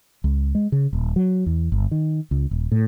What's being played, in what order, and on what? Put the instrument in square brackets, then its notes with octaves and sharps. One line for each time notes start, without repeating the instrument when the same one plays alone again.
[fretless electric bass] C#2
G#3
C#3
D#1
F#3
E2
G1
D#3
C#2
D#1
A2